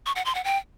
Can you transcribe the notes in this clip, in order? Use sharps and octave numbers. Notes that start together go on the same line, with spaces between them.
C#6
F#5
C6
F#5
G5